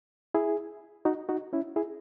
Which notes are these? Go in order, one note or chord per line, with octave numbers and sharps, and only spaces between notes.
E4 G#4
D#4 F#4
D#4 F#4
C#4 E4
E4 G#4